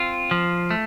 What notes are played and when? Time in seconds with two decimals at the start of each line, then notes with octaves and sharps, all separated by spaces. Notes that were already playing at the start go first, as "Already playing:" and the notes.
Already playing: C4 F4
0.31 F3
0.71 A3